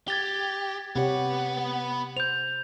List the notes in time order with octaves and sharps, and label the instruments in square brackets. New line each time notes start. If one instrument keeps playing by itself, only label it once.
[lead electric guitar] G4 [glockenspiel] G#6 A6 G7
[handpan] C3 G4 C#5 [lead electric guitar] B3 F#5
[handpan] C5 [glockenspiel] G6 F7